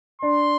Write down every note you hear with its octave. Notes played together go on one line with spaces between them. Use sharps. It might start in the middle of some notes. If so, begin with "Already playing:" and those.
D4 C6